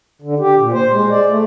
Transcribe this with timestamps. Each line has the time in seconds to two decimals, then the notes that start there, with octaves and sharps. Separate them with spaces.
0.22 D3
0.39 G4
0.59 A#2
0.73 C5
0.92 G#3
1.10 D5
1.29 A3